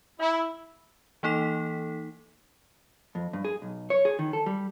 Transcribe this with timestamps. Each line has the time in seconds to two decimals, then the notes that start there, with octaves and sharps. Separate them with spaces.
0.20 E4
1.23 E3 A#3 D#4 A4 B6
3.15 F2
3.33 G2
3.45 G#4
3.62 B1
3.90 C#5
4.05 G#4
4.19 D#3
4.33 A4
4.46 G3